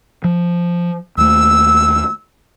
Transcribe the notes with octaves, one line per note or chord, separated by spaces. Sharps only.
F3
D#2 A3 E6